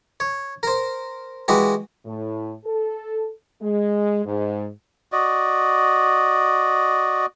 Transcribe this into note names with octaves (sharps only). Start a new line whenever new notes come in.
C#5
A#4 C5
E3 G#3 F#4 G4
A2
A4
G#3
G#2
F#4 D5 D#5